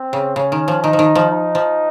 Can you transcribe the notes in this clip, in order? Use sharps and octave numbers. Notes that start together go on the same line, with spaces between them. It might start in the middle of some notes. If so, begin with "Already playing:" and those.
Already playing: C4
C#3
C#3 C#4
D#3
F3
D#3 D#4
F3
D#3
F3
D#4
F3